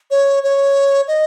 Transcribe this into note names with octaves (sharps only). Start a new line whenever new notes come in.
C#5
C#5
D#5